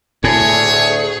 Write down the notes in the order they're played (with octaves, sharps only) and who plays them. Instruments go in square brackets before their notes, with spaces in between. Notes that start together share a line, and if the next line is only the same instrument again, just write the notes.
[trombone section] D2 [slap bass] A2 [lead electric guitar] G#4 [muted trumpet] C#5